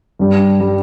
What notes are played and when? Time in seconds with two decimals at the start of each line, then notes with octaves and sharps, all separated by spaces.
0.19 G2 G3 D4
0.60 G3 D4